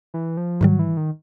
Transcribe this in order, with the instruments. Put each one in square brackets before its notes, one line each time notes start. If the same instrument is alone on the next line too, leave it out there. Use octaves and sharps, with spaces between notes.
[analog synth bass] E3
F3
[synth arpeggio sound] G#2 D#3 G3 [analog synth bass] F#3
[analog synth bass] E3
D#3